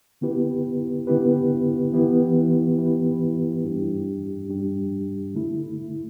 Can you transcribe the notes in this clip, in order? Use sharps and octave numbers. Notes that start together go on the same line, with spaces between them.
D3 B3 E4 G4 B4
D3 B3 E4 G4 B4
E3 B3 E4 G4 B4
E3 B3 E4 G4 B4
G2 G3 D4 G4
G2 G3 D4 G4
D3 A3 E4